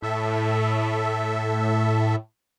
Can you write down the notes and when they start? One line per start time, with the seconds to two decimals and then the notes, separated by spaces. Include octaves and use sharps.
0.02 A2 A4 E5